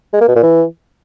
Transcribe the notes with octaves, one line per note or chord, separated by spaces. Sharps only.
G#3
A#3
B2
A#2
E3